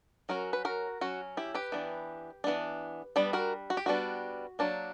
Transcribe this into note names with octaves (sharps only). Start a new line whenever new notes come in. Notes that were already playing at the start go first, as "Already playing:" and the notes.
F#3 C#4 F#4 A#4
B4
F#4 A#4
F#3 C#4 F#4
E4 G4
G4 B4
E3 B3 D4
E3 B3 D4
G3 B3 D4
F#4 A#4
F#4
G4
G3 B3 D4 F#4
F#3 A#3 D4